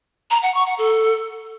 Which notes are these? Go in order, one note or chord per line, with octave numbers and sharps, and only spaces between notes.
A#5
F#5
C#6
F#5
A4